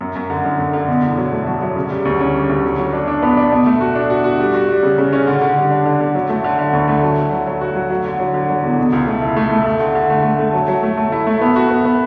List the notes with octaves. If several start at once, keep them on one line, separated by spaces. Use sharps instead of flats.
F#2
F#2
D3
F#2
F#2
D3
B2
E2
F#3
A3
F#3
F#3
C#3
G3
D2
C#4
G3
D2
F#3
F#3
D4
D4
B3
D4
B2
A3
F#4
D4
F#4
F#4
G3
F#4
G3
C#3
C#3
C#4
D3
D3
G3
D4
D3
D3
F#3
A3
D3
D3
D2
A3
F#3
D3
F#3
F#3
F#4
F#3
F#3
D3
F#3
D3
F#3
E2
B2
C#2
A3
E4
A3
A3
A3
D3
D3
A3
A3
A3
F#3
F#3
A3
A3
E4
A3
B3
F#4
B3
B3